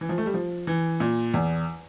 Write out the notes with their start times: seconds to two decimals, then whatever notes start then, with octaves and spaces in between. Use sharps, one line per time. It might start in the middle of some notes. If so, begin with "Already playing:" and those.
0.01 E3
0.09 F3
0.18 A3
0.26 G3
0.34 F3
0.67 E3
1.00 A#2
1.34 E2